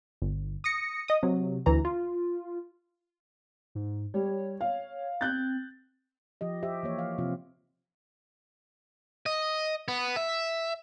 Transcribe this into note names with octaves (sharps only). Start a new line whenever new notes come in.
G1
D#6 A#6 C#7
D#5 D#6
C3 F#3
D2 E3 A#5
F4
G#2
G3 C#5
F5
C4 F#6 G6 A6
F3 G4 D#5
G4 C5 E5
E3 A#3 C#5
F3 F5
C3 F3 C4 F4
D#5
B3
E5